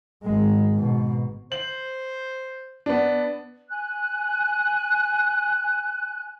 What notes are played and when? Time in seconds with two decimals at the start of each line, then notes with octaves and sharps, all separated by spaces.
0.23 G#1 G#3
0.75 G#2 B2
1.52 C5 F#7
2.86 B3 D4
3.69 G#5 F#6